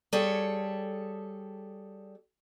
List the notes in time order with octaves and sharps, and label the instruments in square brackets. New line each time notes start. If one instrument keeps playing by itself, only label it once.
[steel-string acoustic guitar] G3 G#4 A4 C#5